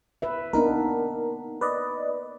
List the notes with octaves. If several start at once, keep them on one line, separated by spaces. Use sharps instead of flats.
B4 E5
A#3 B3 D4 D#4 A#4
B4 D5 D#5